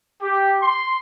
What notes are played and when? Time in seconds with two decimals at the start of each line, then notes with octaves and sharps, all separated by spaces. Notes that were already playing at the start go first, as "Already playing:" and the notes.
0.21 G4
0.61 C6